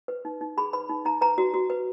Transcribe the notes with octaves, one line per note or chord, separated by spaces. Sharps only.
B4
D#4
D#4
G#4 B5
B4 B5
D#4
D#4 A#5
B4 A#5
F#4
F#4
B4